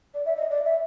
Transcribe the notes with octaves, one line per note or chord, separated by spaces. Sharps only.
D5
E5
D#5
D5
E5